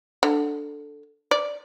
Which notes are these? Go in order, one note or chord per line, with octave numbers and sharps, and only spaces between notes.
D3
D5